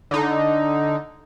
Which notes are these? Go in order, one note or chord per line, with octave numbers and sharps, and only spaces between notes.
D3 D#4